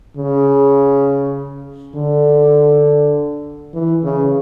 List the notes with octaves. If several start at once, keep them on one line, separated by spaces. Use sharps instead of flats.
C#3
D3
E3
C#3